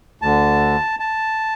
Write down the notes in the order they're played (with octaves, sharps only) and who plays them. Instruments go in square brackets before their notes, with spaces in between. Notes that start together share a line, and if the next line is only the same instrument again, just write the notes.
[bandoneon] D2 D3 A5
A5